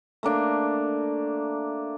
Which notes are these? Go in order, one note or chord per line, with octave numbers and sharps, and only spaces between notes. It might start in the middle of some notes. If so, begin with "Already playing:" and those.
A3 A#3 D4